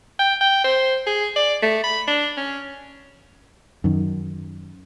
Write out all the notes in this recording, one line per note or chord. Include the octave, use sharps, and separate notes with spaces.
G5
G5
C5
G#4
D5
A3
B5
D4
C#4
F#2 D#3